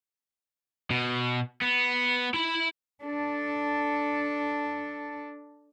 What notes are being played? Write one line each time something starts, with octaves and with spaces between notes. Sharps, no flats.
B2
B3
E4 B5
D4 A4